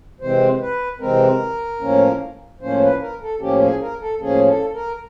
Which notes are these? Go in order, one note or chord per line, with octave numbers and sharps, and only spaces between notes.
C3 E3 G#3 C4 C5
B4
C3 E3 G#3 C4 A#4
A2 F3 A#3 C#4
A2 F3 A#3 C#4 C5
B4
A#4
A4
A2 F3 A#3 C#4 G4
G#4
A#4
A4
A2 F3 A#3 C#4 G#4
A4
A#4